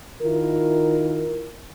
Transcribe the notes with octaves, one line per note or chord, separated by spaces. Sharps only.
D#3 E4 F4 A#4